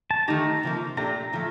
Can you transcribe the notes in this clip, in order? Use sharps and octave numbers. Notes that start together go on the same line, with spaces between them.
A5
D#3 A3 D#4 G4 A#5
C3 F3 A#3
A#2 A3 D4 G4 A#5
A2 F3 A3